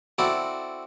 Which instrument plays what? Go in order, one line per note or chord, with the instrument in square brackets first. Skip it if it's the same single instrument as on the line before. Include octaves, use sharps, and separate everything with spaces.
[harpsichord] C4 E4 F#4 A4 D5